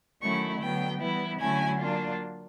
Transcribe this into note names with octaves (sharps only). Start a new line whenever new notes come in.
D#3 F#3 A3 C#4 E4 C#6
D3 F#3 B3 G5
E3 G3 B3 E4
D3 F#3 A3 C#4 E4 G#5
F#3 A#3 D4 F4